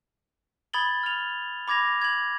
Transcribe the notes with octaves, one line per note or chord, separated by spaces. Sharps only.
B5 D#6 G#6 A6 F#7 G7
F6 F7
B5 D6 G#6 A#6 F7
G#6 F#7